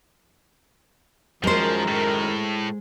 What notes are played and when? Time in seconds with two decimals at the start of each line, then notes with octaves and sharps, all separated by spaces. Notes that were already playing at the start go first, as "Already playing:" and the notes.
1.44 F#2 D#3 F3 G#3 A#4 C5
1.88 A2